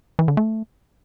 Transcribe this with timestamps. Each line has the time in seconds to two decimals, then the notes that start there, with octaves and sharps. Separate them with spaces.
0.19 E3
0.28 D3
0.37 A3